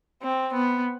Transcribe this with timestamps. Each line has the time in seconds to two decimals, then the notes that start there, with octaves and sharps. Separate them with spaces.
0.23 C4
0.53 B3